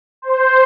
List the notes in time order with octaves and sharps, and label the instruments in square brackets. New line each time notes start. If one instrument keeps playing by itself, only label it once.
[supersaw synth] C5